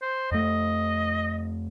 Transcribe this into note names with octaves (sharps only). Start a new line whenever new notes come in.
C5
F2 A3 D#5